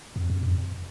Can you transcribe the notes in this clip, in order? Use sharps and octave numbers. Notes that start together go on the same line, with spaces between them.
F2
F#2
F2